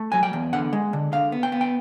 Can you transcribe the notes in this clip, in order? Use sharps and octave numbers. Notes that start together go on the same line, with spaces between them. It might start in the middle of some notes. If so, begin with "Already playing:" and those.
Already playing: A3
F#3 G#5
G5
E2
D3 F#5
G#3
D3
D3 F5
B3
G5
B3
G5